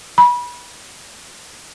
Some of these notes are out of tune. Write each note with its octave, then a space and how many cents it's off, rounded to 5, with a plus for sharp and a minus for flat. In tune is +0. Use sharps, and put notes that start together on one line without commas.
B5 -25